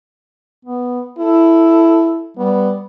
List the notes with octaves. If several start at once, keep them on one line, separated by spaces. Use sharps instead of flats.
B3
E4 A4
G3 B3